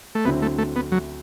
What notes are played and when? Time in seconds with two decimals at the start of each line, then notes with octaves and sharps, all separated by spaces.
0.15 A3
0.25 D2 D3 F#3 B3 C4 E4
0.42 A3
0.58 A3
0.76 B3
0.92 F#3